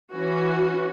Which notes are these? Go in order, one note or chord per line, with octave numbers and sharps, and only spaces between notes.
E3 C#4 F#4